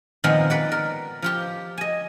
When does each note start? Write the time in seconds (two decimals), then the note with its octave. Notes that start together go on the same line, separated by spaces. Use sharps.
0.24 A#2 D#3 F3 G#3 B3 C4
0.50 B4 D5 F#5
0.72 A#4
1.22 F3 F4 G4
1.78 D#5 G#5